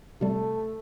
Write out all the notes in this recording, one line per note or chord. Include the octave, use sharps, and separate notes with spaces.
C3 G3 A3